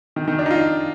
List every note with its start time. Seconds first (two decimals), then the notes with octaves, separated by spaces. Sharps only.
0.16 D#3
0.28 D#3
0.39 D4
0.46 D#4
0.51 F4